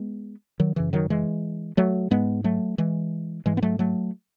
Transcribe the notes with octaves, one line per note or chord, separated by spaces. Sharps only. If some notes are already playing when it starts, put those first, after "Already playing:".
Already playing: G#3 B3
D#3 F#3
F#2 C#3 E3
D#3 F#3
E3 G#3
F#3 A3
G#2 G#3 B3
F#3 A3
E3 G#3
G#2 E3 G#3
B3
F#3 A3
F#3 A3